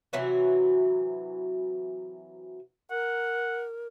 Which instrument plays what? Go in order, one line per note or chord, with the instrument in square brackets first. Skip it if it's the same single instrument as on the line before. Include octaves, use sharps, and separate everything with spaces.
[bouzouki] C3 E3 F#3 F#4
[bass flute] A#4 [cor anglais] F#5